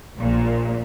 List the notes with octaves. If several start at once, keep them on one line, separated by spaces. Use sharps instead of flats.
A#1 A#2